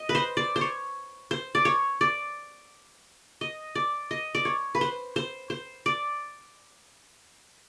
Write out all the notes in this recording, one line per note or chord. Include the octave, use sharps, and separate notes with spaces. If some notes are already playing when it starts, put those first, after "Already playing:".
Already playing: D#5
B4
C5
D5
C5
C#5
C5
D5
C#5
D5
D#5
D5
D#5
D5
C#5
B4
C5
C5
C5
D5